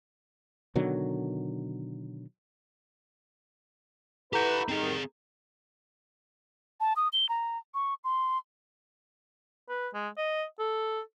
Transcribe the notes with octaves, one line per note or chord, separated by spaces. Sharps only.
B2 D3 D#3 F#3
E4 G4 A4 B4 F#5 A#5 G6
D#3 G3 C4 G#4
A5
D#6
G7
A#5
C#6
C6
B4
G#3
D#5
A4